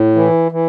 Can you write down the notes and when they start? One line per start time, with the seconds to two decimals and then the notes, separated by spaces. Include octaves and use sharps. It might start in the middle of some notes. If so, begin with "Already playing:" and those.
Already playing: A2
0.15 E3
0.52 E3